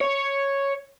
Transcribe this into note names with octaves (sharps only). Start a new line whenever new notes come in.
C#5